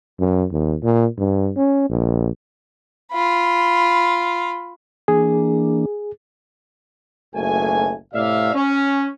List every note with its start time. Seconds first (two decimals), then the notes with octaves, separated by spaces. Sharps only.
0.19 F#2
0.52 D#2
0.83 A#2
1.18 G2
1.57 C#4
1.89 A#1
3.12 F4 B5
5.08 E3 A#3 D4 G#4
7.35 F#1 B1 A3 G#5
8.14 A2 C3 D5 E5 F5
8.54 C#4